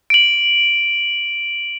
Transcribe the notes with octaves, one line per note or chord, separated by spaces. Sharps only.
D7 F#7